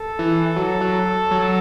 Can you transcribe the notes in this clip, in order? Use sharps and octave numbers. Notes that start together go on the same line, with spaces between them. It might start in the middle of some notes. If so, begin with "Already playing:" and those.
Already playing: A4
E3
F#3
F#3
F#3